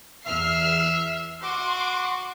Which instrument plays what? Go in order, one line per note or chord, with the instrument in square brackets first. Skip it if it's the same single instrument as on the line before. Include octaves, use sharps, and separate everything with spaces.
[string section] E2 F6 C7 [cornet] E5
[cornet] F#4 [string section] C6 D6